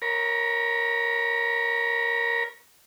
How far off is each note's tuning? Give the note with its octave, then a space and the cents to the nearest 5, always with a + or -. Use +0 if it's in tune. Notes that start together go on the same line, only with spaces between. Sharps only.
A#4 +0 C#5 +0 B5 -40